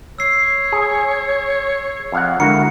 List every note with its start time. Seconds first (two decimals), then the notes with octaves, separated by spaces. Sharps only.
0.19 C#5 E6 C7
0.72 G#4
2.12 F2 F5 F#5
2.40 D3 G#3 E4 F#4 A#4 C#7